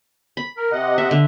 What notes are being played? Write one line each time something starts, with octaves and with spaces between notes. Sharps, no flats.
B5
A#4
C3 D#5 F#5
E5
D3